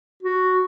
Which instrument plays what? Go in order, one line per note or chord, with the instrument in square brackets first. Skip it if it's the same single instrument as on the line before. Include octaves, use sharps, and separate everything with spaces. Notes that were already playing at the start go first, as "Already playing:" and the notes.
[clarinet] F#4